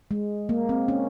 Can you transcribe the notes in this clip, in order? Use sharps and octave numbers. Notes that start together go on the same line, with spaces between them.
G#3
A#3
C4
C#4